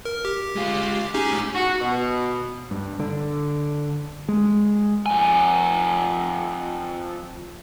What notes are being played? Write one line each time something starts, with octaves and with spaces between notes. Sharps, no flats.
A#4
G4
G#3 F4
C#4 D#4 G4 G#4
A2 G#3
F#4
B2
G2
D3
G#3
F2 G#5